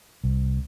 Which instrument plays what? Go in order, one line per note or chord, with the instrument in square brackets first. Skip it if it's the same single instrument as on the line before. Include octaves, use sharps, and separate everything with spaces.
[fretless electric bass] C2